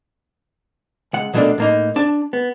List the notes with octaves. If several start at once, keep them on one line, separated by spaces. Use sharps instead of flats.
C#2 F#5
B2 F#3 A3 A#3 D4 A4
A2 A#3 D#4
D4 A5
B3